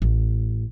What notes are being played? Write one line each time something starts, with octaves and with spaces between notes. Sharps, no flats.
A1